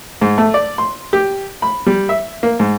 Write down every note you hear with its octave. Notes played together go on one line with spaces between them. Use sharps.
G#2
A3
D5
C6
G4
B5
G3
E5
A#3
G#2